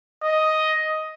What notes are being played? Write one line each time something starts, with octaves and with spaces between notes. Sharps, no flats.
D#5